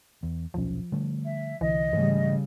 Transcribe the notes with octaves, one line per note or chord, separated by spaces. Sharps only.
E2
D#1 B1 F3 C#4
D3 G3 A3
E5
C2 D3 E3 D#5
G#2 C#3 E3 G3 A3